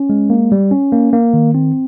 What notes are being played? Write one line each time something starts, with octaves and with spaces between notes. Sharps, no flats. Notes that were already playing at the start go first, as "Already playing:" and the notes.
Already playing: C#4
G#3
A#3
G3
C#4
A#3
A#3
D#3
C4